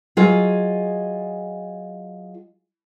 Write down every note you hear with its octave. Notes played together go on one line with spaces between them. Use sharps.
F#3 F4 G#4 D#5 G#5